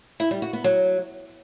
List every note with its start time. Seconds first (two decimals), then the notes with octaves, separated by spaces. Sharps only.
0.20 E4
0.31 G3
0.42 F#4
0.53 B3
0.64 F#3